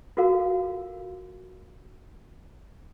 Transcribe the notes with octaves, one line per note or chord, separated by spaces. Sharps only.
F4 F#4 A4 A#4 F5